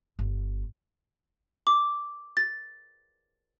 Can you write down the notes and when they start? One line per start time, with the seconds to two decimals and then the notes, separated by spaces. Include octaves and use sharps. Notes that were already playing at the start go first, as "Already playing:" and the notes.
0.19 G1
1.67 D6
2.37 A6